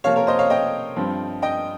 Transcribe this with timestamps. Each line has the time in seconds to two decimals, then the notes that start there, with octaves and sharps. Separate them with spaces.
0.04 C3 F3 A#3 C#5 F5
0.16 A#4 C#5
0.27 C5 D#5
0.39 C#5 F5
0.50 D#5 G5
0.96 G2 F3 C4
1.42 D#5 G5